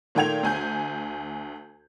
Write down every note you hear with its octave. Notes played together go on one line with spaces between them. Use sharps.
A#2 D#3 A3 G5 G#6 F7
D2 G#5 G6